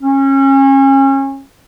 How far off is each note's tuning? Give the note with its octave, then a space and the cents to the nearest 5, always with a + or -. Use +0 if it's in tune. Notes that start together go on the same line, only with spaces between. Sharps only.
C#4 -30